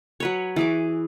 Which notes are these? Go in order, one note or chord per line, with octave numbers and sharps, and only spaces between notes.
F#3 B4 C#5
E3 G#4 D6